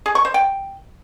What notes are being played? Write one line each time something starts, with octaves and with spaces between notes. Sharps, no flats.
G#4
C#6
C5
G5